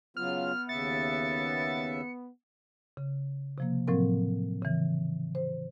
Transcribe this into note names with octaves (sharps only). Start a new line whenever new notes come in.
C#3 F#3 B3 F4 F6
D#2 C#3 E5 A6 C#7
C#3
C3 F3 A#3
A2 F3 F#3 C4 A#4
C#3 E3
C5